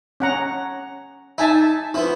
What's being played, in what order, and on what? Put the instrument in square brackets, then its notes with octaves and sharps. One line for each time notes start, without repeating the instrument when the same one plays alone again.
[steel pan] C#4 F#5 A#5
[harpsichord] D#4 [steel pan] E5 G#5 A5
[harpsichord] F3 B3 [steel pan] E4